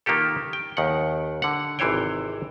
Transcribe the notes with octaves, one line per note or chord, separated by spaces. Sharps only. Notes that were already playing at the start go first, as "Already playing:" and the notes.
D#3 A#3 F4 G4 A4
G5
D#2 D#3 F#5
D3 F#5
G#1 C3 E3 C5 C#5 G5